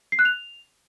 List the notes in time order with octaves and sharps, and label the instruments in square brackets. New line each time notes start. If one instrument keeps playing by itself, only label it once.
[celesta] C7
F#6
F7